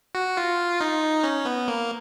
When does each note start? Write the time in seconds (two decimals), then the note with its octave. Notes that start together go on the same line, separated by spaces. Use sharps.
0.15 F#4
0.37 F4
0.81 D#4
1.23 C#4
1.45 B3
1.68 A#3